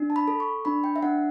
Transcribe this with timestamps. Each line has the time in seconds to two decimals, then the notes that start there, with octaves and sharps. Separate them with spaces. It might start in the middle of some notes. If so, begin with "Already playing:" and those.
Already playing: D4
0.10 A5
0.16 B5
0.28 A4
0.40 C#6
0.65 D4 B5
0.84 G5
0.96 E5
1.03 D4 F#5